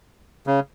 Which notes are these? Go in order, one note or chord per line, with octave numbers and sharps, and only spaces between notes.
C#3